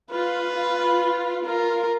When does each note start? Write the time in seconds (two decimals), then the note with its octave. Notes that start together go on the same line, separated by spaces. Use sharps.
0.12 F4 B4
0.56 F4
1.46 F4 A#4